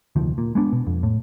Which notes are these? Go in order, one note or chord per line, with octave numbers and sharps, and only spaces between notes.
F1 D2 D#3 F3
A#2
G#3 B3 C#4 D4
B2
F2
A2